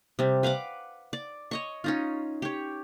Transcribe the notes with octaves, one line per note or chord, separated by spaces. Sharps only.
C3 G3
B4 F5 F#5 D6
D5
C#5 D#5 C#6
C#4 D#4 F4
G4 C#5